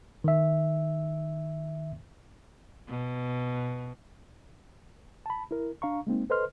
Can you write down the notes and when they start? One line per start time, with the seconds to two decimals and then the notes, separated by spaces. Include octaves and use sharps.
0.24 D#3 E5
2.87 B2
5.26 A5 B5
5.51 E4 A#4
5.82 D4 F5 A#5 C#6
6.07 G#3 A#3 C4 D#4
6.30 A4 B4 C5 D#5 C6 F6